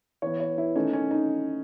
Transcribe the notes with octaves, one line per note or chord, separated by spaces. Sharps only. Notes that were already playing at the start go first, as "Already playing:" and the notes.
E3 B3 C#5
C#5
E4
D#3 A3 C#4 D#4
C#4
D#4